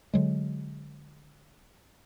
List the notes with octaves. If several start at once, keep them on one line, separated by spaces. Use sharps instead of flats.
D3 F#3 G#3